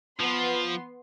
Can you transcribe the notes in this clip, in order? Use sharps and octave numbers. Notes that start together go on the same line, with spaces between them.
F3 B3 C6